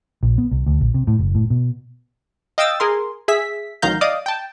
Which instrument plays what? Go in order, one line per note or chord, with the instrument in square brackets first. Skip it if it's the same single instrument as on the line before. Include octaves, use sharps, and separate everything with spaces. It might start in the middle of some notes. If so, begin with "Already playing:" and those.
[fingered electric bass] A#1
B3
C2
D2
A#1
C3
A2
F#1
A2
B2
[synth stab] D#5 F5 G5 D#6 E6 A6
G#4 A#4 C6
G#4 E5 B6
A1 D#3 F#3 F5 A#5 G6
D5 D#5 F5 D6 D#6
G5 A5